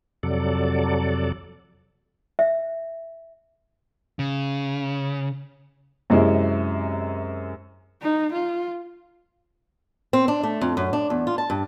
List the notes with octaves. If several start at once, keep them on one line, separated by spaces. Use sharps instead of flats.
F2 C3 F#3 A4 D5
E5
C#3
F#2 C3 G#3 C4 C#4 E4
D#4
F4
C4
D4
A3
F2
F#2
D4
E2
F4
A5
G2